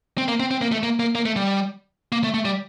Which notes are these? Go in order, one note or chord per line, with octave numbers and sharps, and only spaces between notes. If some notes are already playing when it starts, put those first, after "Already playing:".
C4
A#3
C4
C4
A#3
A3
A#3
A#3
A#3
A3
G3
A#3
A3
A3
G3